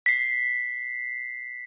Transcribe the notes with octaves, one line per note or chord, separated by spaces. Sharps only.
B6 C7